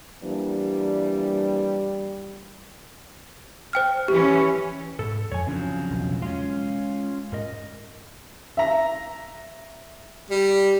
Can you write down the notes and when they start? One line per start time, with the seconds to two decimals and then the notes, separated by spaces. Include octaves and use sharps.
0.23 E3 G3 A#3 D4
3.73 C5 G5 F6
4.08 E3 C#4 G4
4.99 G#2 A4
5.32 F2 C#5 G#5
5.47 C#3 F3 F#3 C4 D4
5.90 E1 B1 E2
6.22 G#3 C#4 F4
7.32 G#2 A#4 D#5
8.57 E5 A#5
10.30 G3